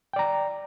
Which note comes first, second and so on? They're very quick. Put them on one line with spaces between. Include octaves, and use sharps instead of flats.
G5 D5 A#5